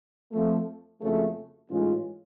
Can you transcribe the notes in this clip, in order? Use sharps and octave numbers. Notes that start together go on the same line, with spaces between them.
F2 F3 A3
F#1 F2 C#3 F#3 A3
A1 G#2 G#3 C#4 F4